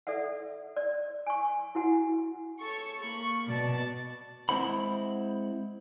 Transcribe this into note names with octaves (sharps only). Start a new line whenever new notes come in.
A4 D5 E5 F#5
D5
G#5 C#6
E4 F#4 F#5 G#5
A4 C#5 C#6
A#3 B5 C#6
B2 D5 A5
G#3 C4 E4 C5 F#5 B5